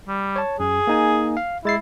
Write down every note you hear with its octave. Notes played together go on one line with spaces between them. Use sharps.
G3
C#5 A5
F#2 G#4
A#3 D#4 G#5
F5
G#3 E4 A6 C7